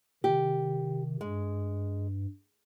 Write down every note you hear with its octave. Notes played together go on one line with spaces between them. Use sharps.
C3 D#3 G4
G2 G#3